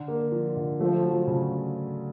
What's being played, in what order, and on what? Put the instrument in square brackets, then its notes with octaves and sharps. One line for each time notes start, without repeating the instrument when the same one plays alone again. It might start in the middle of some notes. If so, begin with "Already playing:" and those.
Already playing: [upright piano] D3
A#3
F3
D3
[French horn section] F3 [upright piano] A3
[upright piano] F#3
C#3